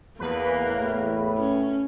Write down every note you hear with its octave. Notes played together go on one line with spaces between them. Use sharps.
E2 A#3 B4
A2
C#4